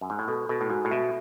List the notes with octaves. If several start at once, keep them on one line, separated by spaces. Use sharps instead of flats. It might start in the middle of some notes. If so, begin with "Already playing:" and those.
F#2
G#2
A2
B2 A4
B2 A4
A2
G#2 F#4
A2
B2 E5